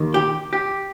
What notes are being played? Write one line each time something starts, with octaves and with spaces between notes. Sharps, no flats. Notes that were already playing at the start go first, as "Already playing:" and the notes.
Already playing: D#2 D#3
G4
G4